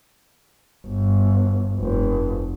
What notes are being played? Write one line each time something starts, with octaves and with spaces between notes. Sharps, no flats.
G1
F1